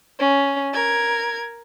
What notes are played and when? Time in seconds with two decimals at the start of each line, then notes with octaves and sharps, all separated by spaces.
0.19 C#4
0.73 A#4 G#6